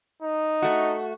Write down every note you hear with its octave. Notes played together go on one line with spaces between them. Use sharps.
D#4
A3 F#4